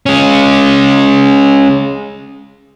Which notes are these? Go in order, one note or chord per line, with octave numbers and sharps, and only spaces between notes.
G#3 C#4